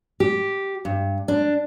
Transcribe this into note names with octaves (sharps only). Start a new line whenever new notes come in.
G4
G2
D4